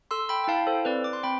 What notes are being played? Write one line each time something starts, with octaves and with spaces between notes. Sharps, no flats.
A4 C6 E6
G5 B5
G5
E4 F5 A5
A4 C5
C4 B4 D5
D6
C6
C4 G5 B5